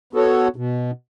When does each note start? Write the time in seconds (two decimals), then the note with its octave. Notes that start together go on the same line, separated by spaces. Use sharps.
0.13 B3 F#4 A4 C#5
0.56 B2